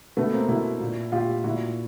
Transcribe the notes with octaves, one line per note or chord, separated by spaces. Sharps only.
B2 A3 B3
A#3 C4
B2 E4 F#4
A#2
A#2 F4 G4
A#2 E4 F#4